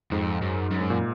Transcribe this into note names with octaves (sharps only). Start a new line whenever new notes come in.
F2 G#2
F#2
F#2
G#2
A#2